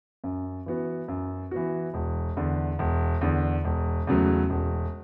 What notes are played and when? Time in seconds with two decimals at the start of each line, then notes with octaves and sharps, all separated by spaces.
0.24 F#2
0.66 E3 B3 F#4
1.08 F#2
1.51 E3 B3 F#4
1.94 E1
2.37 E2 D3
2.79 E1
3.21 E2 D3
3.64 E1
4.07 E2 C#3 F#3 A3
4.50 E1